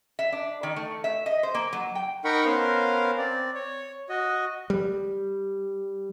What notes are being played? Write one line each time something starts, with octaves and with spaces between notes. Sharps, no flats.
E5
D4
D#3
A3
E5
D#5
C5
A#3
F#3
G5
D#4 A#4 F#5 G5 B5 C#6
B3 C#4 A#4 C5 F5
C4 D5
C#5
F#4 D#5
G3